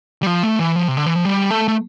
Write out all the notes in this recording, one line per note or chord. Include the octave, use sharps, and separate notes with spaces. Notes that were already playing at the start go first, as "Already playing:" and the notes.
G3
F3
A3
E3
F3
C3
D3
E3
F3
G3
A3
A3